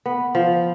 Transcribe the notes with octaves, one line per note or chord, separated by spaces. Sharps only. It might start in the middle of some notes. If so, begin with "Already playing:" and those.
B3
F3